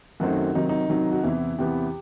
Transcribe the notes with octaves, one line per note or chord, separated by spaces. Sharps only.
F#2 D#3 F#3 A3 C4 F#4
C3 D#3 F#3 D#4
D#4
C3 D#3 F#3
F#4
E2 C3 E3 B3 E4
E2 C3 E3 B3 G4